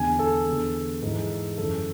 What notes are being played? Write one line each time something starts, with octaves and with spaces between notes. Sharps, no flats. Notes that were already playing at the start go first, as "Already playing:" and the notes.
Already playing: E2 D3 G#5
A4
E2 D3
G#2 E3
F#2 E3 A4